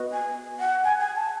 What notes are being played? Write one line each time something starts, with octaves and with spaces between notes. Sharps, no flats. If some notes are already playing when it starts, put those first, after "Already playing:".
Already playing: B3 F#4 B4 D#5
G#5
F#5
G#5
G#5
A5